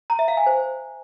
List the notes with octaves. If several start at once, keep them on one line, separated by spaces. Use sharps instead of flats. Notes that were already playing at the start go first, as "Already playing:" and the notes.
A#5
E5
F5
G#5
C5